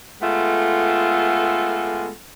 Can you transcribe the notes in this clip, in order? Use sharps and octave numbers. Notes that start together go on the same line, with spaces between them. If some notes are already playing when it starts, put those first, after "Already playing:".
G#3 A3 B3 F4 A4